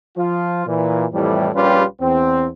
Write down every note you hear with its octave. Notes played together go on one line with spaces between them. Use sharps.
F3 F4
A#2 E3
F2 A2 E3 G3
A#1 G3 C#4 F4 G4 B4
E2 C4